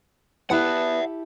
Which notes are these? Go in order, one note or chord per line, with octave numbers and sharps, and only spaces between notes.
B3 E4 G4 A4 E5 F#5